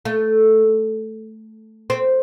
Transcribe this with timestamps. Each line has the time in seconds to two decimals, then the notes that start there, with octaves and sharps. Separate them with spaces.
0.05 A3
1.90 C4